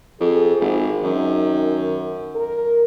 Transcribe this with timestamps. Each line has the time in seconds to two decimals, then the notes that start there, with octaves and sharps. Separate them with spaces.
0.20 F2 G#4
0.61 G#1
1.04 F#2 D#3
2.35 A#4